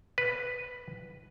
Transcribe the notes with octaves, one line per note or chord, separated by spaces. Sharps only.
B4